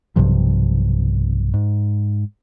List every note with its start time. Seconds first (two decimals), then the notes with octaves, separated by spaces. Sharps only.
0.16 B1 G2 C3 F3
1.54 G#2